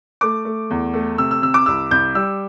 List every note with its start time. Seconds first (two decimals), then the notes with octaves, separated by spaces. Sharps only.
0.21 A3 D6
0.45 A3
0.70 E2
0.94 A3
1.18 C3 E6
1.31 E6
1.42 C3 E6
1.54 D6
1.66 C2 E6
1.91 C2 G6
2.15 G3 E6